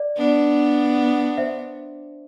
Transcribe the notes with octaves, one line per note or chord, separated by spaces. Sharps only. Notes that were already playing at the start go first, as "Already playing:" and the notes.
Already playing: D5
B3 D4
C5 E5